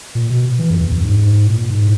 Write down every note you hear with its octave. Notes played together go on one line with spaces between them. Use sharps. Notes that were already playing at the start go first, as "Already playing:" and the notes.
A#2
B2
E3
F#2
E2
F#2
G#2
A#2
G#2